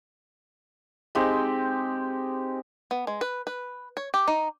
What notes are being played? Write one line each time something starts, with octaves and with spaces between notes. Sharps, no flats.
G#3 C4 D#4 G4
B3
G#3
B4
B4
C#5
G4
D#4